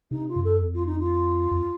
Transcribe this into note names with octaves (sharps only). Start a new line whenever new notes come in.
C3 D#4
F4
F#2
A4
F2
F4
D#4
F4
F2